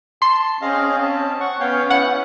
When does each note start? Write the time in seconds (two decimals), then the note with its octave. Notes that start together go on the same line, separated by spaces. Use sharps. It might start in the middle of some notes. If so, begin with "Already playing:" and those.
0.22 A5 C6 C7
0.62 C4 C#4 G#4 D#5 F5
1.02 A5
1.40 F#5 C#6
1.60 B3 C#4 C#5 F5 G5
1.90 E4 F#5